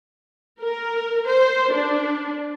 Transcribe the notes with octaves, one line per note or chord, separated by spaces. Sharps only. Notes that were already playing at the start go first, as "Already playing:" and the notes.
A#4
C5
D4